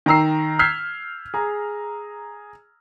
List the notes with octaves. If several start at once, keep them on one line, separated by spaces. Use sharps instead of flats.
D#3 G5 A#5 E6 C7
E6 F6 G6 G#6 B6 C7
G#4 A#5